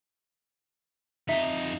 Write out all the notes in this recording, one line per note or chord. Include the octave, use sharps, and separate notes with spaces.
F2 D#4 E5